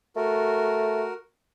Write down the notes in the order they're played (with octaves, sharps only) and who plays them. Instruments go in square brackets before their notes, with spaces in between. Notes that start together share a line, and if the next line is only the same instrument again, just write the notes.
[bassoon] A3 [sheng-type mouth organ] F#4 A#4